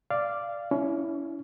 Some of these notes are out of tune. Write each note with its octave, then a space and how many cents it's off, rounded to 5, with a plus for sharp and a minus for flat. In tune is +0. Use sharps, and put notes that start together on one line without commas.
D5 +0 F5 -15
C#4 +30 E4 +0